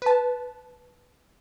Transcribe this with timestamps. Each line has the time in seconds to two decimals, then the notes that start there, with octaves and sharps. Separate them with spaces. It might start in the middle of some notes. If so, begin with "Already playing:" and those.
0.02 B4 A5